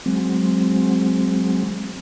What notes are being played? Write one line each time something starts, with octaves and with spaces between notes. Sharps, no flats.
F#3 G#3 C4